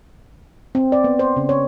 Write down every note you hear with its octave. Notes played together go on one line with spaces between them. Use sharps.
C4
D5
B3
C5
C#3
C#5